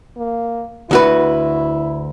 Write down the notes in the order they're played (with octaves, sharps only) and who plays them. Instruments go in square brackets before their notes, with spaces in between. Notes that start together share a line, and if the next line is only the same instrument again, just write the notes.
[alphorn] A#3
[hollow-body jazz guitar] D2 F#4 B4 [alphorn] E4